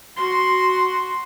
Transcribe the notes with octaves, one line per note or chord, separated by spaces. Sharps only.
F#4 C6